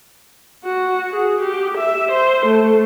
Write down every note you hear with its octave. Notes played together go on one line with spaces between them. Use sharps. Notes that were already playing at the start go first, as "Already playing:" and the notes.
F#4
G#4
G4
E5
C5
A3